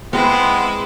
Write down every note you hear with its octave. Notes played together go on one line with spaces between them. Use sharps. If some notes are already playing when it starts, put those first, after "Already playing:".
G#3 B3 C4 E4